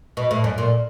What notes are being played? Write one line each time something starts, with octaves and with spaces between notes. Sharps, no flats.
B2
A2
F#2
A#2